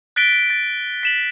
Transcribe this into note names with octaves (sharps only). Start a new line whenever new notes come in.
F#6 A6 B6 D7 G7
A6
B6 E7 F#7